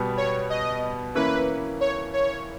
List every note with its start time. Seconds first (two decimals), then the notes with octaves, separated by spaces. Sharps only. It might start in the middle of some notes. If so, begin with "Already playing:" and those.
Already playing: B2 G3 B3
0.17 C#5
0.50 D#5
1.15 E3 A#3 C#4 E4 B4
1.81 C#5
2.14 C#5